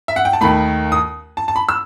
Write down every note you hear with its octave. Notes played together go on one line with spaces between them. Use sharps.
E5
F#5
G5
A5
D#2 D#3 A3 B5
D#6
A5
A5
B5
E6